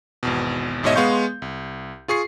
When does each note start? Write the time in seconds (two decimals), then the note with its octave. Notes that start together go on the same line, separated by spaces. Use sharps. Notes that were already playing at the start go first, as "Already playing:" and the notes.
0.23 G#1 E2 B2
0.83 A1 G#2 B2 C#5 D#5 E5
0.95 G#3 B3 F5 C6 C#6 G6
1.42 C2
2.08 F4 G#4 C#6 C7